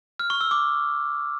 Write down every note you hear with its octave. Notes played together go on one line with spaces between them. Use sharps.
F6
C#6
E6
D6